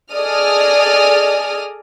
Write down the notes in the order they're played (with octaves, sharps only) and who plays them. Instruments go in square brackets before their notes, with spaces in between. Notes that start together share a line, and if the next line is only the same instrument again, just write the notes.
[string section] G#4 A4 D5 D#5 D#6 F6